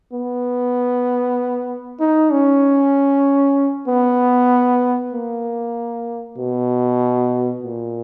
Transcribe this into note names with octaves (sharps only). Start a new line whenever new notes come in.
B3
D#4
C#4
B3
A#3
B2
A#2